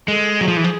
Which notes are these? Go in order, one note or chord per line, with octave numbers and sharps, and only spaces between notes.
G#3 A4
F#3 G#4
F3
E3
F3